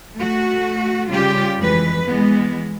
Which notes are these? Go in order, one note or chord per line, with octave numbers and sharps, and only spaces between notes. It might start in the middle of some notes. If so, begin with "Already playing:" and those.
A3 F#4
C#3 G3 F4 G4
F2 E3 G#3 B4
E3 G#3 B3